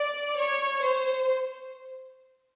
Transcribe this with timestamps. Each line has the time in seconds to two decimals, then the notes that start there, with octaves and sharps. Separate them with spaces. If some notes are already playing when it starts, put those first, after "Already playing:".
Already playing: D5
0.38 C#5
0.83 C5